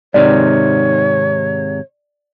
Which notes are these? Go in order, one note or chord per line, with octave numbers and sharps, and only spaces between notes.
G#2 C3 D#3 C#5 D5